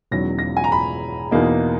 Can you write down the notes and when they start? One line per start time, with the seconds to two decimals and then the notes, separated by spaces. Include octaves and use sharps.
0.11 E1 E2 D#3 F#3 C#4 A#6
0.39 A#6
0.57 G#5
0.64 A#5
0.72 B5
1.31 E2 B2 A#3 D#4